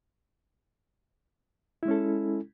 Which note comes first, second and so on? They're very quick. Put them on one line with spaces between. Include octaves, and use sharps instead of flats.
E4 G#3 C#4 A4